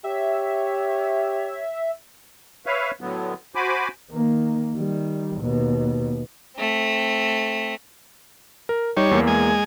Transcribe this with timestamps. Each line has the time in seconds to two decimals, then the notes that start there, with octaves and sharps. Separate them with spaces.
0.04 G4 C#5 E5
2.66 B4 C#5 E5 F5
3.01 A2 D3 F#3 B3
3.55 F#4 C5 G#5 B5 D6
4.11 D#3 A#3
4.74 D#3 G3
5.39 D#2 B2
6.56 A3 C4
8.69 A#4
8.97 G3 D#4 C#5
9.11 E2 A#3
9.27 G#3 G#5